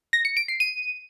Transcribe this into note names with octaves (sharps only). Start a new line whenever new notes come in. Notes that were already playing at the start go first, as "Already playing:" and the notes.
A#6
C#7
D7
C7
D#7